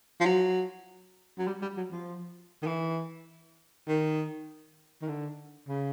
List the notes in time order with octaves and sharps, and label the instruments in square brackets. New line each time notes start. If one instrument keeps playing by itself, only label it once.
[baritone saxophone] F3
F#3
F#3
G3
G3
F#3
F3
D#3
E3
D#3
D#3
D3
C#3